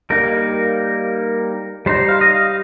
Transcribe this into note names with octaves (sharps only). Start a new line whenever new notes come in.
G3 A#3 D#4 A#4
G3 D#4 C5
F5
D#5
F5